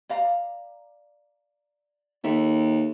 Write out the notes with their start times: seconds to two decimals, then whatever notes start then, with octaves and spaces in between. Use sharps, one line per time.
0.09 D5 F5 A#5
2.24 D#2 A4 E5